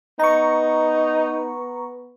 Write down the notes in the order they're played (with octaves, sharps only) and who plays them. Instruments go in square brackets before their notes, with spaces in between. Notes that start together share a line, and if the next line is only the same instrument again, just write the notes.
[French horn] B3 [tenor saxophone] D#4 [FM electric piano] A#5 C#6